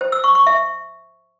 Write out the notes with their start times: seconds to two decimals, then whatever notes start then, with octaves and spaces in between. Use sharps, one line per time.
0.01 C5
0.12 E6
0.24 C#6
0.35 C#6
0.47 E5